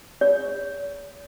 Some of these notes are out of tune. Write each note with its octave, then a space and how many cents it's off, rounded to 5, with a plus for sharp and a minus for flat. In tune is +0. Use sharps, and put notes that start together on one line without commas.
G#4 -45 C#5 +45